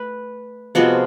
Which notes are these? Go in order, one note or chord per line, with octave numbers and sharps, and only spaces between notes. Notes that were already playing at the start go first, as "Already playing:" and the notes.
Already playing: A3 B4
C3 F3 G#3 B3 F#4